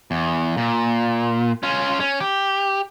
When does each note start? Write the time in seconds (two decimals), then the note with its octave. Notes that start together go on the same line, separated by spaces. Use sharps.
0.11 E2
0.57 A#2
1.63 C#4 F4
2.00 C#4
2.20 G4